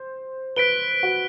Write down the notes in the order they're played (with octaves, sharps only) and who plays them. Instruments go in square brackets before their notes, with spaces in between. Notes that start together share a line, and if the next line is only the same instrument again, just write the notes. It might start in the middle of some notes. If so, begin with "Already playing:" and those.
Already playing: [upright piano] C5
[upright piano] B4 [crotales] F#6 B6 D7 G7
[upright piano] F#4